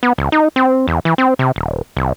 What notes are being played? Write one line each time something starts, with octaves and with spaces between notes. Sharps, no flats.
B3
C#2
D#4
C4
E2
E3
C4
C3
D#1
C2